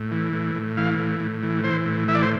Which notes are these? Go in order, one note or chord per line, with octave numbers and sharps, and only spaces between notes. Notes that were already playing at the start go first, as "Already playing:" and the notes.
Already playing: A2
E3
A2
A2
E3 F5
A2
A2
E3
E3 C5
A2
E3 E5
D5
C5